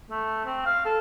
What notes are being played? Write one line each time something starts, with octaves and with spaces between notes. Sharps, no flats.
A3
C4
F5
A4